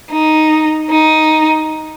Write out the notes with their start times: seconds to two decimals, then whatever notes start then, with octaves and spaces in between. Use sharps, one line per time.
0.12 D#4
0.90 D#4